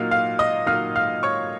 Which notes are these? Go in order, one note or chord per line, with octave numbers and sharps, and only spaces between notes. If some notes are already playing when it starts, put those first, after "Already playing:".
Already playing: A#2 F#3 A#3 D#4 F5 F6
F5 F6
D#5 D#6
A#2 F#3 A#3 D#4 F5 F6
F5 F6
C#5 C#6